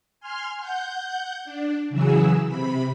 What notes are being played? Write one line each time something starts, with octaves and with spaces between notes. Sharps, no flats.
G#5 C6 F6
F#5 G6
D4
C#3 E3 F#3 G#4 E6
C3 B5